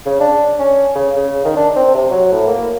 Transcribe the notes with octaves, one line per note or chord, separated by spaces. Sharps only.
C#3
D4
C#4
C#3
C#3
D#3
D4
C4
C3
F#3
A2
A#3